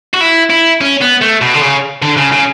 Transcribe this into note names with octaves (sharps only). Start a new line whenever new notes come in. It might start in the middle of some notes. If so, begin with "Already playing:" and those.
F#4
E4
E4
C#4
B3
A3
B2
D3
C#3
D3
C#3
C#3